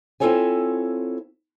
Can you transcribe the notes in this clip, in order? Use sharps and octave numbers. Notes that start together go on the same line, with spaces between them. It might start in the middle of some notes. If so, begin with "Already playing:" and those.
C4 E4 F4 A4 C#5 G#5